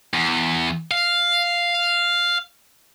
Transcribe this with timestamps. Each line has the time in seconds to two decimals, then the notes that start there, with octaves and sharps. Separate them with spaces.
0.14 E2
0.91 F5